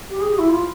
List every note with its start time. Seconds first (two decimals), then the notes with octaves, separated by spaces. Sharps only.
0.10 G4
0.20 G#4
0.30 G4
0.38 E4
0.49 F4